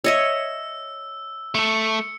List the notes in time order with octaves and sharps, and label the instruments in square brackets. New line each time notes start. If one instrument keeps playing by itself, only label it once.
[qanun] C#5 D#5 E5 [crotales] E6
[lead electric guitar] A3 A4 [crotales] C#7